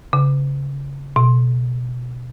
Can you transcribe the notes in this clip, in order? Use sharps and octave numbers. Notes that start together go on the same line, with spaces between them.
C#3
B2